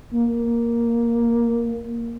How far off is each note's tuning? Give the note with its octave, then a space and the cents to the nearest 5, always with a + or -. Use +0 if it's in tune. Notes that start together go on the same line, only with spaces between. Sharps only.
A#3 +5